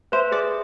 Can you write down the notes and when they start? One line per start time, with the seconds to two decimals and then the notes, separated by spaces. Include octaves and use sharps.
0.12 B4 C5 E5
0.32 G#4 D5